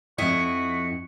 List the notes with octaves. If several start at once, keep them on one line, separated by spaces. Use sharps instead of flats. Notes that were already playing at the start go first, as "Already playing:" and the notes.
F2 E4 F#4 D#5 B6 C#7